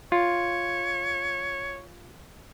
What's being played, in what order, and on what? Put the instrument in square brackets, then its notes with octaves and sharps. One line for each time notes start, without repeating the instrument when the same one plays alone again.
[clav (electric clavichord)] F4 [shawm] C#5